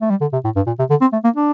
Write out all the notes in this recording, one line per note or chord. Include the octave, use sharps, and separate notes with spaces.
A3
G3
D3
C3
A2
G2
A#2
C3
D3
C4
A3
A#3
D4